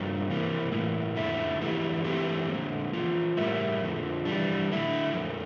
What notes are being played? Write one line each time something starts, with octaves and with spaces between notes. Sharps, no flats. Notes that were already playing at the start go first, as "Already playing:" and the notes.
Already playing: G2 F3 A#3 D4 F4
C3 E3 A#3
A2 E3 A#3
F2 D3 A3 E4
E2 E3 A#3 E4 G4
E3 A3 C4 E4 G4
D3 F3 A#3
E3 A#3 F4
A2 G3 A#3 E4
F2 D3 F3
E3 G3 D4
D3 A3 E4
F2 D3 F3 A#3